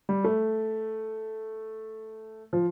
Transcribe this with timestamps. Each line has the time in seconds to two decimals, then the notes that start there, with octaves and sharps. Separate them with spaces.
0.09 G3
0.24 A3
2.53 F3